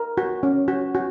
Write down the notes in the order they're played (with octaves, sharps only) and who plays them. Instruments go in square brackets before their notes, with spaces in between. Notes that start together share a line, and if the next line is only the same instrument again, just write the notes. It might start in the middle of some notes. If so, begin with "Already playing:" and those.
Already playing: [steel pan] A#4
F#4
C#4
F#4
F#4